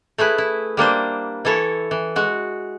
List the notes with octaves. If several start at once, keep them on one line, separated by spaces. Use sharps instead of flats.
A3 E4 G#4 B4
E4
G3 A#3 D4 C5
E3 E4 A4 C#5
E3
G#3 F#4